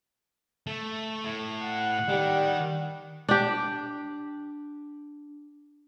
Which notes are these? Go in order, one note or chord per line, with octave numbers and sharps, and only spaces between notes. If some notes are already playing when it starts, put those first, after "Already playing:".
A3
A2
F#5
D#3 G3
D4 G4